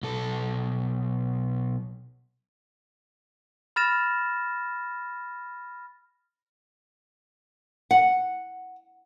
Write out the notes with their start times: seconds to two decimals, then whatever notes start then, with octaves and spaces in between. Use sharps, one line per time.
0.03 B1 A4
3.76 B5 F6 A6 A#6 E7
7.91 F#5